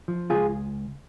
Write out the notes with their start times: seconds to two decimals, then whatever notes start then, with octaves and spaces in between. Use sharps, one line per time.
0.08 F3
0.30 C#2 F4 G#4